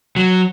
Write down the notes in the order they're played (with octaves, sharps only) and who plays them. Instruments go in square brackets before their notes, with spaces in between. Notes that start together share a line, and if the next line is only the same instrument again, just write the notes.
[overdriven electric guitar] F#3